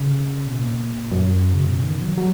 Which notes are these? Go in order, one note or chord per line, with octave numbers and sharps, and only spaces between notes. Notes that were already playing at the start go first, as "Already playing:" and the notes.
Already playing: C#3
B2
A#2
F#2
C#3
B2
D#3
F#3
F#3